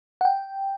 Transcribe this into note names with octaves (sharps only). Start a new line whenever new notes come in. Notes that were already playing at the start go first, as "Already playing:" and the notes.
F#5
G5